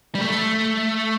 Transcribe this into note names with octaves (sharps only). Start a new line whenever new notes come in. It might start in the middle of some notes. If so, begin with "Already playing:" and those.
G3
A3